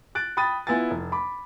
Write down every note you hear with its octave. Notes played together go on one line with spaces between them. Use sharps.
F#6 A6 D7
G5 B5 D#6 A6 D#7
B3 E4 F4 G#5 A6
F1
B5 D6